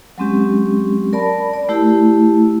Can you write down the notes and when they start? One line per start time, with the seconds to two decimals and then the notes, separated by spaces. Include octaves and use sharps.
0.18 F#3 G#3 C4 C#4 G4
1.13 A#4 D5 A5 B5
1.54 D5
1.69 A3 E4 G4